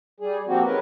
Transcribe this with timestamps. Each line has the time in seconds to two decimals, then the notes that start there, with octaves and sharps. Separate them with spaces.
0.20 G3 G#4
0.47 F3 A#3 C4 F#4 G4
0.64 D#3 G#3 C#4 A#4 B4